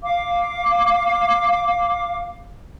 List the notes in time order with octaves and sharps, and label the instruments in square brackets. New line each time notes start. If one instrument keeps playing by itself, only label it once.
[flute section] F5 D6